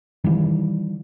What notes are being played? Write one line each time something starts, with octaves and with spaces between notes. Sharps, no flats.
D#3 E3 G3